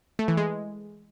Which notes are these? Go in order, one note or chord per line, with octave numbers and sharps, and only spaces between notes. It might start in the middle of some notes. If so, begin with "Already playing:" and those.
A3
E3
G#3